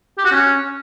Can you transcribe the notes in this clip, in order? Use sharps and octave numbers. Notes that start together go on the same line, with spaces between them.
G4
F#4
C#4